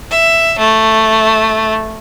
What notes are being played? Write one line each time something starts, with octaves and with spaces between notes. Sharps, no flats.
E5
A3